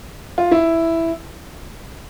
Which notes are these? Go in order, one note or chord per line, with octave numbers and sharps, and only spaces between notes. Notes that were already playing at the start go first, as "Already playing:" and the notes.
F4
E4